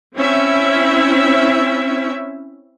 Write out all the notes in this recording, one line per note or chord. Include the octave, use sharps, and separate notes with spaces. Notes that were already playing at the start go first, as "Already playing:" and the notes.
C4 C#4 E4 E5